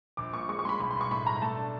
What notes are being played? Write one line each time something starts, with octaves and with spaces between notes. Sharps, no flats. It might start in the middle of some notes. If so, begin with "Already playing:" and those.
A#1 D6
A#2 C#6
G#3 C#6
C#6
G#3 B5 C6
B1 B5
C6
B1
C#6
A2 B5
B1 A#5
A3 A5
D4